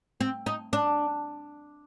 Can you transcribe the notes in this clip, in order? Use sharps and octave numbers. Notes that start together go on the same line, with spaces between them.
C4
D#4
D4